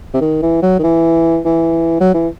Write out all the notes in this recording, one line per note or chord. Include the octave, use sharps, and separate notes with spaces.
C3
D#3
E3
F#3
D#3
E3
E3
F#3
E3